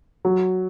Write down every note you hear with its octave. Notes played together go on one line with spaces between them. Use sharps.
F#3